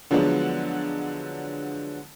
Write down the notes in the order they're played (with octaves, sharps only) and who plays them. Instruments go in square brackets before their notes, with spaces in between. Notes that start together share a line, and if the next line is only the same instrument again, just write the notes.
[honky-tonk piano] D3 F3 F#3 G#3 B3 D4